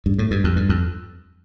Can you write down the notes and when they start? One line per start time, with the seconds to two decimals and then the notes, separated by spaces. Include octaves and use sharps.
0.06 G2
0.19 A2
0.31 G2
0.44 F2
0.56 G2
0.69 F2